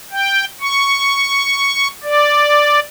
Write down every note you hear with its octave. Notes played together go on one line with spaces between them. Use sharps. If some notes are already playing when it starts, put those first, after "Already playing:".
G5
C#6
D5